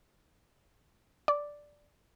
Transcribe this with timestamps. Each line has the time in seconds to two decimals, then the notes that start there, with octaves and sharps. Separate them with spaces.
1.28 D5